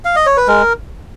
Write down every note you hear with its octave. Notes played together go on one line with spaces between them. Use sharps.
F5
D#5
C#5
B4
G#3 A#4